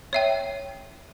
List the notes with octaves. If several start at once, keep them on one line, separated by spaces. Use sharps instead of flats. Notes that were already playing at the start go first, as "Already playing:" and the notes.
C#5 E5 G5